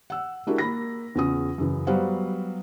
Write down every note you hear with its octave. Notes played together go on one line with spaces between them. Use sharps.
F#5 E6
G#3 D4 E4 F#4 G4 A#4
A#3 B5 A#6
E2 C#3 C#4 F4 D#6
F#2 C#3 E3
F#3 G3 B3 C5 F5 F#5